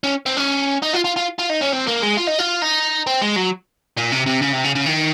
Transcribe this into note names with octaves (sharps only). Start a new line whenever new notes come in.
C#4
C4
C#4
D#4
F4
F4
F4
F4
D#4
C#4
C4
A#3
G#3
F4
D#4
F4
D#4
C4
G#3
F#3
A#2
C3
C3
C#3
C3
C#3
C#3
D#3